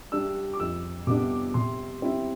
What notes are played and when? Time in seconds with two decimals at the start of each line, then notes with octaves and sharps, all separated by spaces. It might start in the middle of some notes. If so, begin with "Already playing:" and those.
0.12 G3 D4 E6
0.53 D6
0.59 F2 E6
1.07 C3 G3 B3 D4 D6
1.54 C3 C6
2.02 G3 C4 E4